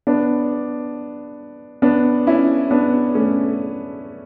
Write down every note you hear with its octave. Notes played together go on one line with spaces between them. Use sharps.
B3 D4
B3 D4
C#4 E4
B3 D4
A3 C#4